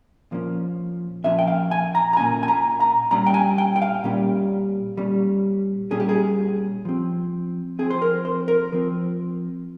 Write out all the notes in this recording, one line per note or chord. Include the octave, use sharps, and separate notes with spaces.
A#2 F3 A#3 C#4
A#2 F3 A#3 C#4 E5
G5
F5
G#5
A#5
A#5
A#2 F3 A#3 C#4 G#5
G#5
A#5
A#5
A#2 G3 C#4 A#5
G5
G#5
G5
G5
F5
A#2 G3 C#4
A#2 G3 C#4
A#2 G3 C#4 G#4
G4
G#4
F3 C4
F3 C4 G#4
C5
A#4
C5
A#4
F3 C4